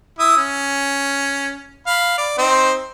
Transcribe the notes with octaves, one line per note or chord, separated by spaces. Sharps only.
E4 D#6 E6
C#4
F5 B5
D5
C4 D#4 C5